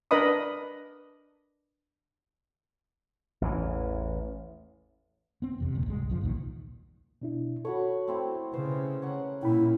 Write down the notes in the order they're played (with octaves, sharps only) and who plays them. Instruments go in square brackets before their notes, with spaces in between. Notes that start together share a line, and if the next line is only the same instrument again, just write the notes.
[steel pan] D4 A#4 B4 D#5 B5 D#6
[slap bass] A1 E2 E3
[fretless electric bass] B3 C4
F1 E2 C3
D1 D2 A#2
C2 G2 G#3
C#2 F#2 F3
B1 E2 A#2 D#3
[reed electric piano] B2 D4 E4
[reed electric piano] F#4 A4 [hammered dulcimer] C#5 F#5 B5
[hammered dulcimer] A3 C4 E4
[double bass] C#3 [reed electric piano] B4 [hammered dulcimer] C5
[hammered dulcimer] C#4 A#4 F#5
[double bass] A#2 [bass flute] E4 [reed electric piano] G5 B5